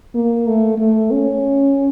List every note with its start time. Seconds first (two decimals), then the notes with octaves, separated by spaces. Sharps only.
0.15 A#3
0.47 A3
0.78 A3
1.11 C#4